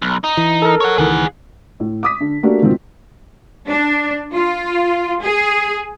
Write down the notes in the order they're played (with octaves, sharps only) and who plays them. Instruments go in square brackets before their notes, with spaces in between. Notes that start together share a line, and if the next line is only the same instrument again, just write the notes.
[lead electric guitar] B1
D#4
[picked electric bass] E3
[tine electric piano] A4 A#4
[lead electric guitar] C#5 F#5
[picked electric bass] C#2 D#3 E3 [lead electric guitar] G#4 F#5
[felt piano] A2
D6 D#6 B6
D3
A3 A#3 D4 F#4 G4 A#4
G#2 B2 D#3 F3 C4
[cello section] D4
F4
G#4